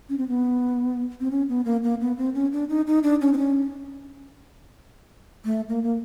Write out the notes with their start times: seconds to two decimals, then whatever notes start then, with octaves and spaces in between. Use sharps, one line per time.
0.09 C#4
0.18 C4
0.28 B3
1.20 C4
1.31 C#4
1.49 B3
1.65 A#3
1.83 A#3
2.01 B3
2.17 C4
2.35 C#4
2.52 D4
2.69 D#4
2.87 D#4
3.03 D4
3.21 C#4
3.33 C4
3.38 C#4
5.45 A3
5.69 A#3
5.83 A#3